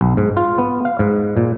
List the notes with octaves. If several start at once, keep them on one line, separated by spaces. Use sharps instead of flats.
B1
G#2
F4
B3
F5
G#2
A#2